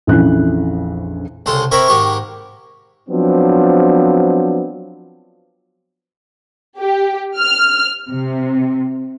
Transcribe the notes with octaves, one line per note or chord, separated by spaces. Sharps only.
A#1 F2 C#3 E3 F#6
C2 C#3 A4 C6
C4 E4 A#4 C#5 E5 B5
G#2 D#3 G4 C#6
F3 F#3 B3 C4 D4
G4
F6
C3